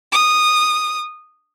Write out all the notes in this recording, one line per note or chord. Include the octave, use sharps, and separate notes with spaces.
D#6